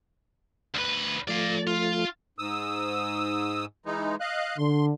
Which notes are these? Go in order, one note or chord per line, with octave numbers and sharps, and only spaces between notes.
D2 B4
F3 A3 D5 F5
F4
G#2 D#6 E6
E3 G#3 D#4
D#5 F5 F#6
D3 C6